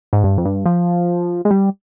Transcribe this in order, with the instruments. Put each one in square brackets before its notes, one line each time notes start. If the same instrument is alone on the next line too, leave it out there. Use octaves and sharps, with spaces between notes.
[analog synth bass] G#2
G2
F2
G2
F3
G#3
G3